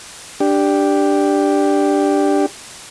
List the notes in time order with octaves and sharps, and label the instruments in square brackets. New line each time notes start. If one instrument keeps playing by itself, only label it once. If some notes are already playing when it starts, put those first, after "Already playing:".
[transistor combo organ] D4 G4